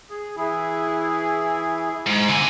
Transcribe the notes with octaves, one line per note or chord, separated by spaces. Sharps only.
G#4
E3 E4 G#4
G#2
D3 G#5